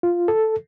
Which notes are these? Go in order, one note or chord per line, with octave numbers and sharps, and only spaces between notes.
F4
A4